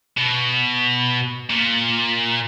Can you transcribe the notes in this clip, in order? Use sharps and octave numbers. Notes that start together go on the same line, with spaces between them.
B2
A#2